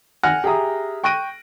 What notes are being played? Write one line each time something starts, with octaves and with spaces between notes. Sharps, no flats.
F#5 G#5 F6 F#6 A#6 C#7
G4 G#4 E5 A#5 D#6
G5 C#6 F#6 A#6 D7 D#7